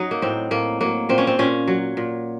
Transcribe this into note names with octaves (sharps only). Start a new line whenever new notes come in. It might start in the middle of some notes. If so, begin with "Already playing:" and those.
Already playing: F#3 D#4
A#3
A2 C4
A2 A#3
F#3 A#3
A#2 C4
C#4
C4
A#2 C#4
F#3
A#2